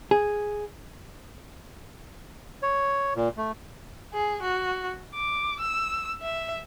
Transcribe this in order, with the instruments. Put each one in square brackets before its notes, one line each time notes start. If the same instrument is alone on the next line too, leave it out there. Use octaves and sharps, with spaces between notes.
[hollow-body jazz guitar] G#4
[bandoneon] C#5
A#2
A3
[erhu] G#4
F#4
D6
E6
E5